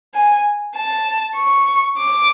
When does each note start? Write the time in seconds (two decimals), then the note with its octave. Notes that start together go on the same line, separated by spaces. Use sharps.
0.14 G#5
0.75 A5
1.36 C#6
1.99 D6